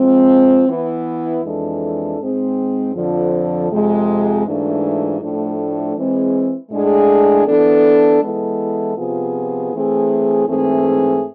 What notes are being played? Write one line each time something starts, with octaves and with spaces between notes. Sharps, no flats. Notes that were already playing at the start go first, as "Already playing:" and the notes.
Already playing: F3 G#3 C4
E3 B3 E4
F2 E3 G#3 D4 A4
G#2 G#3 C4 G#4
F2 D3 F3
F2 C3 G#3
G#2 E3 A3 D4 F4
A2 F3 A3 D4
E3 G#3 C4 G#4
A2 G#3 D4 G#4
E3 B3 D4 A4
E3 G#3 B3 E4 A4
C3 F3 B3 F4 G#4
E3 A3 C4 G#4
G#2 E3 A3 C4 G#4